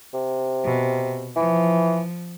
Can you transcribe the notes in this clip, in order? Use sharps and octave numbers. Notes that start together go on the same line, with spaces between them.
C3
B2
E3 F3